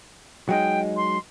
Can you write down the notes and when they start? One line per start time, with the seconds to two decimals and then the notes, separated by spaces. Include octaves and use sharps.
0.49 F#3 G#3 D#4 G5
0.97 C6